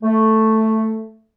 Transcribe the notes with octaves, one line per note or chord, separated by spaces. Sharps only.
A3